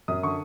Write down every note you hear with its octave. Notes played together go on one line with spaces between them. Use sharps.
F#2 D#6
D3 C#6